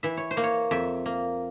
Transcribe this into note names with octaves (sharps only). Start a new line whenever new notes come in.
E3 E5
C#5
C5
A#3
C#5
F2 E5
A#3